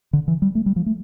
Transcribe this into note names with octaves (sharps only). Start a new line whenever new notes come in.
D3
E3
G3
A3
G3
F3
A3